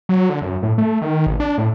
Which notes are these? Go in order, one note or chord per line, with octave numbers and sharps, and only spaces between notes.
F#3
D3
F#2
A2
A3
D#3
A1
D4
A2